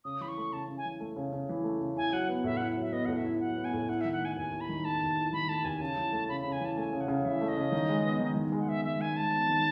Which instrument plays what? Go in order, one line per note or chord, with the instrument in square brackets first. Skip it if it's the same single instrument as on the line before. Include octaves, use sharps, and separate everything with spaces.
[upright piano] C#3 [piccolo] D#6
[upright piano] E3 [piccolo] B5
[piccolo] C#6
[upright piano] A3
[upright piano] C#3 [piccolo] A5
[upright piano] C#3
[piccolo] G#5
[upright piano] E3
A3
C#3
C#3
E3
A3
C#3
[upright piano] E4 [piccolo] G#5
[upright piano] F#3 [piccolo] F#5
[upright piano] B3
[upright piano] A2 [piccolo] E5
[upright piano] E4 [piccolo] F#5
[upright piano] F#3 [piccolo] E5
[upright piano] B3 [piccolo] D#5
[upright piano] A2 [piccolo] F#5
[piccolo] E5
[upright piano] E4
[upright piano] F#3 [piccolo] F#5
[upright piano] B3
[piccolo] G#5
[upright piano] A2
[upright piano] E4 [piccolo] F#5
[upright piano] D#3 [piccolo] E5
[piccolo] F#5
[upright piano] A3 [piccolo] G#5
[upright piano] D#2 [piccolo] G#5
[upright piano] E4
[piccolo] B5
[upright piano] D#3
[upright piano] A3 [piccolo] A5
[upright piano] D#2
E4
[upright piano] D#3 [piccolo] B5
[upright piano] A3 [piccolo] A5
[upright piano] D#2 [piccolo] G#5
[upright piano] C#3 [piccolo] A5
[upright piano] E3
A3
[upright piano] C#3 [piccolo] B5
[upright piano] C#3 [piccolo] B5
[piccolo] G#5
[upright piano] E3 [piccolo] A5
[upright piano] A3 [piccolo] G#5
[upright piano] C#3
[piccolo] F#5
[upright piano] C#3
[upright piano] E3 [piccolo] E5
[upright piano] A3
[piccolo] D#5
[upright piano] C#3
D#3
G#3
B3
D#3
D#3
G#3
[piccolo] F#5
[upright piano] B3 [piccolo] E5
[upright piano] D#3 [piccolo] E5
[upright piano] D#3 [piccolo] G#5
[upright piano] G#3 [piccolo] A5
[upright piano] B3
D#3